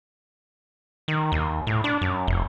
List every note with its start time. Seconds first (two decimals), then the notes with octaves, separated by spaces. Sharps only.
1.08 D#3
1.32 D#2
1.67 A2
1.84 D4
2.01 F#2
2.27 F1